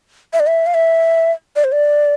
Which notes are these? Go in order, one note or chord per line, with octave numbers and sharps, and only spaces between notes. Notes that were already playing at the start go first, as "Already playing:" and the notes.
E5
D5
E5
F5
E5
D5
C5
D5